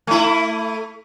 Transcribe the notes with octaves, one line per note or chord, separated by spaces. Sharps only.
A3 E4